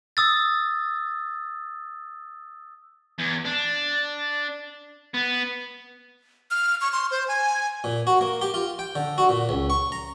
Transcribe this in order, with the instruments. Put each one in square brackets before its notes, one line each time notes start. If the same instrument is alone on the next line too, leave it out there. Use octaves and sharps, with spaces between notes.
[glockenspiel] D#6 E6 A6
[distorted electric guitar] E2
D4
B3
[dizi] F6
C#6
C6
C5
G#5
[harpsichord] A#2
F#4
A#3
G4
F4
G5
D3
F#4
A#2
C#2
C#6
A#5